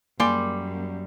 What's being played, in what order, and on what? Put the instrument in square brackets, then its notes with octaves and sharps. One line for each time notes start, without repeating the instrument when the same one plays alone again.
[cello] F#2 [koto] G3 [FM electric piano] A#3 [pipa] G#4 D5 C6